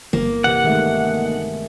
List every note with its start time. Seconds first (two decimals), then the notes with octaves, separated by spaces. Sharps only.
0.13 G1 A#3
0.44 C3 E3 F#5
0.64 D#3 G#3 A3